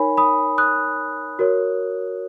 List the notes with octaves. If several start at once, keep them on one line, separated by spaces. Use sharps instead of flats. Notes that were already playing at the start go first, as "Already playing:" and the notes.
Already playing: D#4 A#4 C#5 G#5 B5
B5 D#6
D#6 F#6
F#4 A#4 C#5